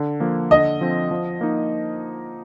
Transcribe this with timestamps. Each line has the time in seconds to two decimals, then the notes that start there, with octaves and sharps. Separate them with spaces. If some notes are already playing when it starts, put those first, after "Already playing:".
Already playing: D3
0.20 F3 A#3
0.51 D3 D#5
0.81 F3 C4
1.11 F3
1.41 A#3 D#4